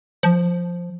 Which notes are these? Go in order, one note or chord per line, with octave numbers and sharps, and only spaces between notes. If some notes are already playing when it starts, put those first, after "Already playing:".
F3